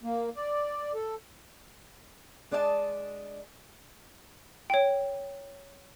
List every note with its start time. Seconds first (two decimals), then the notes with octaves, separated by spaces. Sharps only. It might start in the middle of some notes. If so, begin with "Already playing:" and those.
0.03 A#3
0.36 D5
0.94 A4
2.51 G#3 D4 D5 D#5 F#5 A5
4.70 C#5 G5